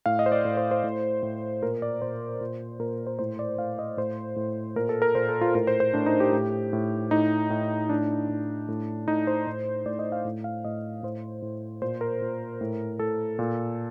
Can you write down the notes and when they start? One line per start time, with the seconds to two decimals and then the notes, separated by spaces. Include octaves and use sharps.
0.06 A2 F5
0.19 D#5
0.26 C5
0.32 D5
0.45 A2
0.57 C5
0.71 C5
0.84 A2
1.23 A2
1.62 A#2 A#4
1.82 D5
2.02 A#2 C5
2.41 A#2
2.79 A#2 A#4
3.07 C5
3.19 A2 C5
3.39 D5
3.58 A2 F5
3.79 D#5
3.97 A2 C5
4.36 A2
4.76 A#2 A#4
4.89 A4
5.02 A#4
5.15 A#2 C5
5.29 A4
5.41 F4
5.55 A2 A#4
5.67 C5
5.80 C5
5.94 A2 D4
6.06 D#4
6.20 G4
6.33 A2
6.73 A2
7.11 A2 D#4
7.50 A2
7.89 A2 D4
8.29 A2
8.68 A2
9.08 A2 D#4
9.27 C5
9.47 A2
9.86 A2 D5
9.99 D#5
10.12 F5
10.25 A2
10.44 F5
10.65 A2 D#5
11.03 A2 C5
11.42 A2
11.82 A#2 C5
12.01 A#4
12.22 A#2
12.61 A2
12.99 A2 A4
13.39 A#2